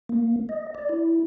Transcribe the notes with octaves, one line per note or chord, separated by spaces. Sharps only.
A#3
D#5
D5
E4